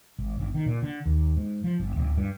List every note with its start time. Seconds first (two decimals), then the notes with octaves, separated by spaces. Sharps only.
0.18 G#1
0.40 G1
0.54 D#3
0.66 A#2
0.82 D3
1.06 D#2
1.37 G#2
1.64 F3
1.79 G1
1.96 D1
2.18 G2